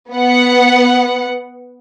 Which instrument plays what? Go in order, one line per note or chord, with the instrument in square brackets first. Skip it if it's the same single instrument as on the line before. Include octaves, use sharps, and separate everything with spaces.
[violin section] B3 F#5